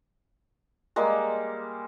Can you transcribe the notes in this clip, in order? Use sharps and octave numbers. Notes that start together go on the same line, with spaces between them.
G3 G#3 A#3